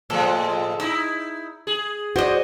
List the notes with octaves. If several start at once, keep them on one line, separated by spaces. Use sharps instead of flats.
A2 F3 G#3 A4
D#4 E4 E6
G#4
F#4 C5 D5 D#5